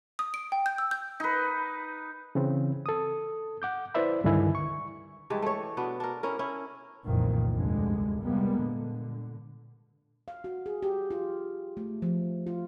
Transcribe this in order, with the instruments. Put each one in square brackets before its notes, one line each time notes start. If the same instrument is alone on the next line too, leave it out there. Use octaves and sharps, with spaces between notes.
[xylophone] D#6
D7
G5
G6
E6
G6
[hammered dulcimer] D#4 B4
[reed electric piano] C#3 E3 C4
A4 D#6
F#5 D6 G6
E4 B4 C5 D5 E5 B5
C#2 G2 D3 D#3 E4 G#5
C#6
[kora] G2 E3 G#3 G4
A3 C#5
B2 B3 D4
D4 A#4
C#4 E4 A#4
C#4 E4
[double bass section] F1 C2 F2 A#2 D#3 E3
F1 D2 G2 D3 G#3
C3 G3 G#3 A#3 B3
A#2 D3
[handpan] F5
F#4
G#4
G4
F4
A3
F3
F4